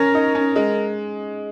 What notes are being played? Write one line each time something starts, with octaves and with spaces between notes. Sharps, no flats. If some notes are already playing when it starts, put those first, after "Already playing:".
Already playing: C#4 A#4
D#4
C#4
G#3